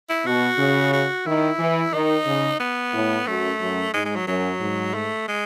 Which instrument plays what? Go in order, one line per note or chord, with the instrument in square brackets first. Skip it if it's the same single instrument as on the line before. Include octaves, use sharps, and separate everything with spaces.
[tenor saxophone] E4
[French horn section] B2 [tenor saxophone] F#4
[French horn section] C#3
[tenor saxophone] F#4
[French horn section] D#3 [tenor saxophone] E4
[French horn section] E3
[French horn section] D#3 [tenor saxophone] D#4
[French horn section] C#3
[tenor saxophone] B3
[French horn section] A2
[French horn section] F#2 [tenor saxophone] A3
[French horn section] F#2
[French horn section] G#2 [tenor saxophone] G#3
[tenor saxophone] G#3
F#3
[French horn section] F#2 [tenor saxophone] F#3
[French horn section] G#2
[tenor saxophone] A3
G#3